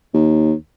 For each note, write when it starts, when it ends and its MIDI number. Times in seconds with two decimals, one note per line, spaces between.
0.14 0.53 39